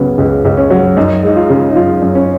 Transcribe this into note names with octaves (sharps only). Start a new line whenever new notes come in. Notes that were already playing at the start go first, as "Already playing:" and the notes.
Already playing: C#2 C#3 F#3 B3
C#2
C#2
C#4
F#3
F#2 D#4
G#3 D#4
F4
C#3
D#4
F#2 F4
F#2
C#4